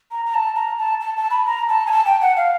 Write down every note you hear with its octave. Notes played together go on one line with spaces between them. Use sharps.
A#5
A#5
A5
A#5
A5
A5
A5
B5
A#5
A5
G#5
A5
G5
F#5
F5